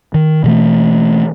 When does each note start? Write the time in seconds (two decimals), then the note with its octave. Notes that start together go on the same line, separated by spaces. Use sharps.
0.14 D#3
0.44 B2 E3 A3